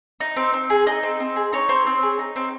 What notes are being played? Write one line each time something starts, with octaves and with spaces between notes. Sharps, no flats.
D#4
C4
C4
G#4
D#4 D#5
C4
C4
G#4
D#4 C#5
C4
C4
G#4
D#4
C4